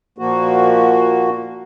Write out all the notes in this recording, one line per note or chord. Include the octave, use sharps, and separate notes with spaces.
A#2 F3 A#3 F#4